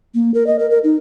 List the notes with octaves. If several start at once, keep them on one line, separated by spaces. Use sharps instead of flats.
A#3
A#4
D#5
A#4
A#4
D#4